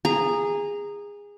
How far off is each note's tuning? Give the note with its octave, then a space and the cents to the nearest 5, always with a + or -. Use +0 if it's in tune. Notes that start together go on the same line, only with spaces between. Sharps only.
G#4 -20 A#5 +0